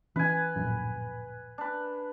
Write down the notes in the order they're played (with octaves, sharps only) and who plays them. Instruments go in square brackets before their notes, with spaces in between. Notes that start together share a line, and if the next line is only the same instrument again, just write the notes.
[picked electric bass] E3 C#4 [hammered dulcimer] B4 G#5
[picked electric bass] D1 A#1 F#2
[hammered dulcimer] D4 B4